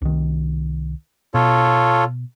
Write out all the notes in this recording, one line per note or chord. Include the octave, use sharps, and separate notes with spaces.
C2 D#3
B2 F4 A4 C#5